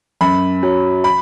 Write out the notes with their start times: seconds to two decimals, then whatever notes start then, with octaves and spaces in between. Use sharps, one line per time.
0.21 F#2 B5
0.63 F#3
1.04 B5